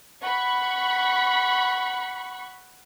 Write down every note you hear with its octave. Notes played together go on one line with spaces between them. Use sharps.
F#5 B5 C#6